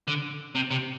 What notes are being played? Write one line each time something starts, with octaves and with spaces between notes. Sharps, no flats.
D3
C3
C3